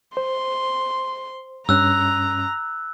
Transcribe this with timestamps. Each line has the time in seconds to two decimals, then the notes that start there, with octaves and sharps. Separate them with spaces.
0.17 C5 C6
1.69 G2 C#4 A#5 E6 F#6